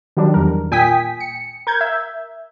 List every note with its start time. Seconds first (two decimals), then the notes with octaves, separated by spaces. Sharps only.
0.17 D#3 F#3 G3 D4
0.34 E2 A#4
0.71 A#2 G5 G#5 D#6 B6
1.20 C#7
1.67 A#4 G6 G#6
1.81 E5